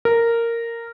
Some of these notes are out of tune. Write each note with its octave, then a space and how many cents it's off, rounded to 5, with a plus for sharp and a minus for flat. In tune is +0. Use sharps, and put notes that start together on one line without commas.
A#4 -10